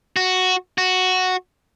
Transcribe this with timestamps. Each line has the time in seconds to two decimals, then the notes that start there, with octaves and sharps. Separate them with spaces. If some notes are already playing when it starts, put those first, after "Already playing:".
0.16 F#4
0.78 F#4